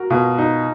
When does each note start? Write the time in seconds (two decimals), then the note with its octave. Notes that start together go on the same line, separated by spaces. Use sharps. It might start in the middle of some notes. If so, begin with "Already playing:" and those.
Already playing: F#4 A#4
0.10 B2 F4
0.38 D#4